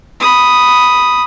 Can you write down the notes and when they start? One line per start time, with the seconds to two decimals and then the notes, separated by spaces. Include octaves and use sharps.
0.20 B5 D#6